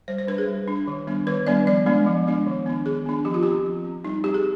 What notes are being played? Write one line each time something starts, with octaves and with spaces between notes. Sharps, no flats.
G3 C5
C5
D4 B4
G#4
G3
D4
D#3
G3 B3 D4
D#3 B4
G3 B3 D4 D5
F3 D5
G#3 B3 D4
F3
G#3 B3 D4
D#3
B3 D4
D#3 G#4
B3 D4
F3 G4
F4
C4 G4
F3
C4
G3 D#4
C4 G4
G#4